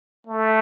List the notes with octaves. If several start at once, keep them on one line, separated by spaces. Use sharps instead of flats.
A3